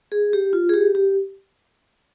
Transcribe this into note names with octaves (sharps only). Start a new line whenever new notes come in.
G#4
G4
F4
G#4
G4
G4